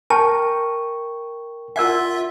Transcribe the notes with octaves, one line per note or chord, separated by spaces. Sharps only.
A#4 G5 A5 C#6
F4 A#4 D5 E5 F#5